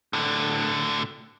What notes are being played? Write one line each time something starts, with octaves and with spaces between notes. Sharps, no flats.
A2 D3